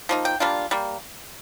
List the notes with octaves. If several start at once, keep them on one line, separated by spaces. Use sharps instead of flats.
F3 A#3 D#4
G5
G3 A#3 D4 F4
G3 A#3